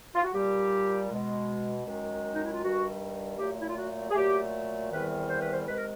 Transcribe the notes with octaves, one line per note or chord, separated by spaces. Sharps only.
F4
F#4
A#2 G3 G4
B2 G#3
F#2 D#3 G#3
D#4
E4
F4
G2 D#3 G3 F#4
A#2 F#3 A3 G4
E4
F4
F#4
G#4
A#2 F#3 A3 G4
E2 C3 D#3 G3 B4
C5
B4
C5
C3 D#3 G#3 B4
A#4